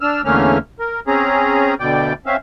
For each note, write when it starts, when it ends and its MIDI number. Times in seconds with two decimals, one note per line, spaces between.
0.01 0.22 62
0.01 0.22 88
0.01 0.22 89
0.25 0.58 40
0.25 0.58 50
0.25 0.58 57
0.25 0.58 58
0.25 0.58 61
0.25 0.58 89
0.79 1.00 70
1.07 1.74 60
1.07 1.74 61
1.07 1.74 68
1.07 1.74 82
1.80 2.13 38
1.80 2.13 47
1.80 2.13 74
1.80 2.13 79
2.26 2.36 60
2.26 2.36 61
2.26 2.36 76
2.26 2.36 77